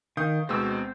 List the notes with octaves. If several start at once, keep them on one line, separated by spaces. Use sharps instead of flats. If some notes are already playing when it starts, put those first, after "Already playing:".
D#3 F5 D#6 G6
D2 B2 G#3 C4 E6